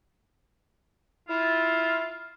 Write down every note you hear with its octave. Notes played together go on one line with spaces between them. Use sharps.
E4 F4